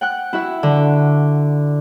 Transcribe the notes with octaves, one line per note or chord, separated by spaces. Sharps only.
F#5 G5 F#6
E4 F#4 E5
D3